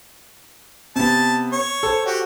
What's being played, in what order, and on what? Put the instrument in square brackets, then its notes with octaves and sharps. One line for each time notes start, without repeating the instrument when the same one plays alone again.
[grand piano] C3 B3 [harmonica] A5
[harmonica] C#5
[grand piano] A4 C5
[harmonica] F#4 G4